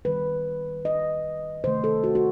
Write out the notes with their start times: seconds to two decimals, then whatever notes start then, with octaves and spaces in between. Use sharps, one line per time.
0.05 D#3 G3 B4
0.85 D#5
1.64 C3 D#3 A3 C5
1.84 A4
2.04 F#4
2.15 F#4